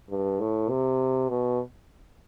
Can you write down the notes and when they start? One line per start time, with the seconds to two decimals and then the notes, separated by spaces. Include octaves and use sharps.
0.10 G2
0.40 A2
0.70 C3
1.29 B2